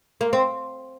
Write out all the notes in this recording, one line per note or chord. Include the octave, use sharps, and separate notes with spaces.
A#3
C4